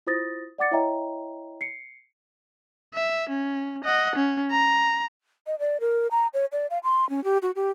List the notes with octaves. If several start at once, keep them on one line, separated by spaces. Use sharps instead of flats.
E4 F4 C5 D#6 A6 A#6
D5 F#5 D6 A6 C#7
E4 C#5 D#5 E5 G5 A#5
C7 C#7
E5
C#4
D#5 F#5
C#4
A#5
D#5
D5
A#4
A#5
C#5
D5
F5
C6
C#4
G4
F#4
G4